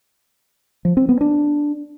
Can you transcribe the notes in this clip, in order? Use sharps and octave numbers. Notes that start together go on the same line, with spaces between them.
F3
C4
B3
D4